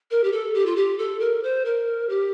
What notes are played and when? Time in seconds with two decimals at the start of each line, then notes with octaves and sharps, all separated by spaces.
0.11 A#4
0.24 G4
0.32 A4
0.54 G4
0.66 F4
0.76 G4
0.98 A4
1.20 A#4
1.43 C5
1.65 A#4
2.09 G4